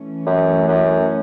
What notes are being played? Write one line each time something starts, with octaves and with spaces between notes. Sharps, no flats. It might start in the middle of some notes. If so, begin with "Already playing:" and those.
Already playing: E3 A3 C#4
F#2
F#2